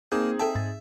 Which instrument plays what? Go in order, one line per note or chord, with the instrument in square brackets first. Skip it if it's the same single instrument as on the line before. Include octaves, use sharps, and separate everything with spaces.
[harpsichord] A#3 A5 [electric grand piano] C4 D#4 G#4 [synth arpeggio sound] G6
[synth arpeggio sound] A4 G5 A5 [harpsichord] E5
[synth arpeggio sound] G#2 A6